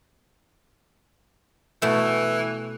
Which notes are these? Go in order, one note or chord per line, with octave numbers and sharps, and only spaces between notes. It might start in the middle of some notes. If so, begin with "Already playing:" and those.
B2 E3 A3